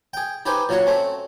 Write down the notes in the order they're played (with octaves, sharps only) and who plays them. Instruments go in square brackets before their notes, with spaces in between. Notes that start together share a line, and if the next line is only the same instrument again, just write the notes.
[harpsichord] G#4 G5
D#4 G4 G#4 B4 C5
A#2 F#3 F#4 C#5 C#6
A3 C4 C#4